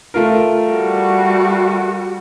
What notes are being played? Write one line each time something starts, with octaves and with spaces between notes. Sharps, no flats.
A3 F4 A#4
G3 F#4